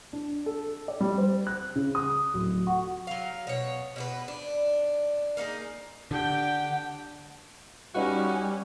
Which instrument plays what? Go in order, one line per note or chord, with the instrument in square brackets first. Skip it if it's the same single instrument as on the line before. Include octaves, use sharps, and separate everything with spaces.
[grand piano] D4
A4
D5
G3
C5
F#6
C#3
D#6
D1
F#4
[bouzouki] F#3 F5
B2 C#5
B2 F#4 B4
D4
A#3 D#4 F#4 G#4
[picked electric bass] D3 [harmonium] D4 [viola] G4 G5 [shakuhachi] F#5
[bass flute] G3 [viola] C#4 [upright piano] D#4 B4 F5 [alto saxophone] F#4